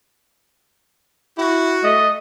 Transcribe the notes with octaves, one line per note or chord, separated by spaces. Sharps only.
E4 F#4
A3 D#5